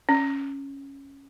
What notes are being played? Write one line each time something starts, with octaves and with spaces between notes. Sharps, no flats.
C#4